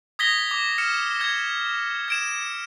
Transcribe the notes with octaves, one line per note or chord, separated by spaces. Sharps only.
D#6 G#6 A#6 B6 G7
D6
F6 C#7 E7
G#6
G#6 D7 E7